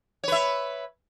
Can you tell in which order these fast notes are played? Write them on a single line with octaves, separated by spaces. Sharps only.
C#5 B4 E5